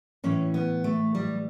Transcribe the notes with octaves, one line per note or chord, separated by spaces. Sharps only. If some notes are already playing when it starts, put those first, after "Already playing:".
A2 E3 C#4
B3
A3
G3